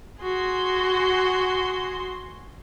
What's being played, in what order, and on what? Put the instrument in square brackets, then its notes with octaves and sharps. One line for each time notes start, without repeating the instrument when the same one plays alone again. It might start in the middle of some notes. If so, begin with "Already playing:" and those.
[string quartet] F#4 G#4 C6